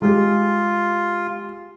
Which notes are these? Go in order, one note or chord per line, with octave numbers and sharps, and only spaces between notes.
G#3 F4 G4